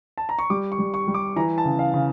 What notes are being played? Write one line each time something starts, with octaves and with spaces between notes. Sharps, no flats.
A5
A#5
C#6
G3 D6
C#6
G3
C#6
G3
D6
E3 A#5
A5
C#3
F5
C#3